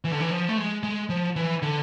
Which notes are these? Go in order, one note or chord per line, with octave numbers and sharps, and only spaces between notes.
E3
D3
E3
F3
A3
G#3
G#3
F3
E3
D3